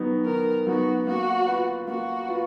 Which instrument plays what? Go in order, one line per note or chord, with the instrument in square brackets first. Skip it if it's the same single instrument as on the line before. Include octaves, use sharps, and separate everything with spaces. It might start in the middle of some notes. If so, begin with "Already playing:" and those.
Already playing: [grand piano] D#3 F#3 B3 D#4
[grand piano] D#3 [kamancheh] A#4
[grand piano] F#3 B3 D#4 [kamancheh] F#4
[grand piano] A#3 [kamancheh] F#4
[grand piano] F4 B4
[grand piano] A#3 [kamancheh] F#4
[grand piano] F4 B4